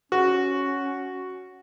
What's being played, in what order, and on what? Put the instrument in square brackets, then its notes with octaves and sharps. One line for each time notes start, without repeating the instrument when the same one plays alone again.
[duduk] C#4 [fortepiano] F#4